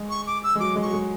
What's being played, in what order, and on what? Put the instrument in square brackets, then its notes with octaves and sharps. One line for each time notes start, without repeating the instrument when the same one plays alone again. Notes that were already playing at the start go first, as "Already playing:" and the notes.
Already playing: [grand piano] G#3
[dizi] C#6
D6
E6
[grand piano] G#3
[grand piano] F#3 [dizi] D6
[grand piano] G#3
[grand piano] F#3 [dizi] C#6
[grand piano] G#3